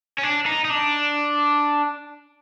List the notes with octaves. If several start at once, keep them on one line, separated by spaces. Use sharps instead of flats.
C#4
D4
D#4
D#4
D4